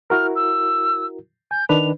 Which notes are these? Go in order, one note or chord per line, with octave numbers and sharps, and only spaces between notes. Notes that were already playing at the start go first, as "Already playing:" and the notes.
E4 F#4 A#4 F6
E6
G#5 G6
D#3 D4 B4 F7